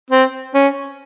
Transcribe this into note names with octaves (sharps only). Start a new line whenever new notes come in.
C4
C#4